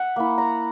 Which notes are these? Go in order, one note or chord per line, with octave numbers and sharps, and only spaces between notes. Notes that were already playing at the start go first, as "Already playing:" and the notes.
Already playing: E5 F#5
A#3 E4
A#5